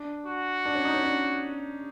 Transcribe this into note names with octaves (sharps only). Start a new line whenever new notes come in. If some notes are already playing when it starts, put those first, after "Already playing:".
Already playing: D4
F#4
D4
C#4
D#4
C#4
D4